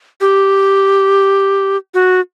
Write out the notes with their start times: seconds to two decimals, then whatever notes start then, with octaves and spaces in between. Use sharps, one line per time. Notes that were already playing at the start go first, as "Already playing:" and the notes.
0.21 G4
1.94 F#4